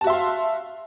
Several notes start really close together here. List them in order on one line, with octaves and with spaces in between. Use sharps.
A5 F#4 E5 C6 F5